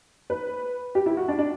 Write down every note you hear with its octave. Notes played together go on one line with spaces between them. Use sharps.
B4
G4
E4
F#4
D4
D4